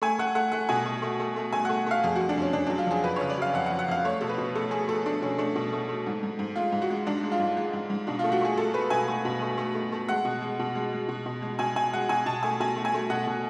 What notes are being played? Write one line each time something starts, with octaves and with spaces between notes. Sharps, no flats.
A3 G#5
A3 F#5
A3 F#5
A3 F#5
B2 G#5
A3
A3
A3
A3
A3 G#5
A3 F#5
A3 F5
F2 G#4
F2 F#4
D4
F2 C#4
F2 D4
F#3 D4
F4
F2 G#4
F2 B4
C#3 C#5
D5
F#3 F5
F2 F#5
F#5
F2
F#5
F2 F5
A3 C#5
B2 A4
B4
B2
A3 A4
A3 G#4
A3 A4
A3 D4
B2 C#4
A3 D4
B2
A3
A3
G#2
G#2
G#2
G#3 F4
G#2
F#4
G#3
G#2 D4
G#3
F4
G#2
G#3
G#2
G#2
B2 D4
A3 F4
F#4
A3 G#4
A3 A4
A3 B4
B2 G#5
A3
B2
A3
A3
A3
A3
G#3 F#5
B2
G#3
B2
G#3
G#3
B2
B2
G#3
B2 G#5
B2 G#5
G#3 F#5
B2 G#5
B2 A5
A3 G#5
B2 G#5
A3
G#5
A3
B2 F#5
B2